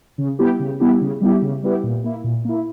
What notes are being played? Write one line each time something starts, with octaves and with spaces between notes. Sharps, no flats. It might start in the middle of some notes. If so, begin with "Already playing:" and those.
C#3
G3 B3 E4 G4
C#3
G3 B3 E4 G4
C#3
G3 B3 E4 G4
C#3
G3 B3 E4 G4
A#2
A#3 E4
A#2
A#3 E4